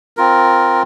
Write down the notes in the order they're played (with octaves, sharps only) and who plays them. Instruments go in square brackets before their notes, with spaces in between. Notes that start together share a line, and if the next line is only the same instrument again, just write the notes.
[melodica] C4 F4 A#4